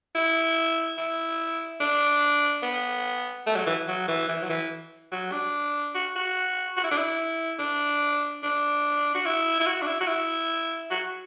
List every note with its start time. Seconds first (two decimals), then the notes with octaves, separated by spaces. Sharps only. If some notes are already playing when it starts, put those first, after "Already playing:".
0.15 E4
0.98 E4
1.80 D4
2.63 B3
3.46 A3
3.56 F#3
3.66 E3
3.88 F#3
4.08 E3
4.28 E3
4.42 F#3
4.50 E3
5.12 F#3
5.32 D4
5.95 F#4
6.16 F#4
6.77 F#4
6.84 E4
6.91 D4
6.98 E4
7.59 D4
8.43 D4
9.14 F#4
9.25 E4
9.60 E4
9.66 F#4
9.82 D4
9.87 E4
10.01 F#4
10.08 E4
10.91 F#4